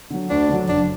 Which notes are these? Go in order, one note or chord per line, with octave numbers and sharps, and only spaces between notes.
D3 F#3
D2 D4
D3 F#3
F#1 D4